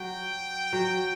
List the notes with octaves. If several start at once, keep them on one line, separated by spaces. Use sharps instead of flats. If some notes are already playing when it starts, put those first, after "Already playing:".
Already playing: F#3 F#4 G5
F#3 F#4